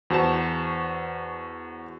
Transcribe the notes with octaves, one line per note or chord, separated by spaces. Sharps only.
E2 F#4 C5 A5 E7